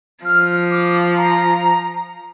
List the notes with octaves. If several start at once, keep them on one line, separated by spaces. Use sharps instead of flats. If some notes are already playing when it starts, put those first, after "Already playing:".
F3 F6
D6
A#5